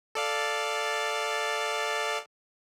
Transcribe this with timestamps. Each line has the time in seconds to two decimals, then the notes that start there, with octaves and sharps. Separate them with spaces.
0.15 A4 D5 F5